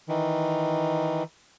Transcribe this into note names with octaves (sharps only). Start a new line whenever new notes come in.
D#3 E3